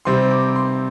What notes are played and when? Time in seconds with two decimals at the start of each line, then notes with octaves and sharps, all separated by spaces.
0.05 C3 G3 C4 C6
0.31 D6
0.56 C6